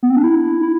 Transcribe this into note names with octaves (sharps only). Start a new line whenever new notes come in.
B3
C4
D4
E4
E4